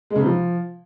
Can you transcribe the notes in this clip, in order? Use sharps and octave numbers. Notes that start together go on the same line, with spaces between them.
G#3
C#3
C3
F3